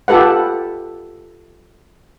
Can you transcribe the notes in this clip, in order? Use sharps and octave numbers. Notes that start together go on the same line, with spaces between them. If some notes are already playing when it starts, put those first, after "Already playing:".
F4 G4 A4 B4 F#5